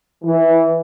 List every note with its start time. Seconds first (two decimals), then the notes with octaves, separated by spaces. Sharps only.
0.23 E3